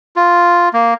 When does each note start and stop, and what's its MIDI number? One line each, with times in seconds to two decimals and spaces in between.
0.16 0.69 65
0.73 0.94 58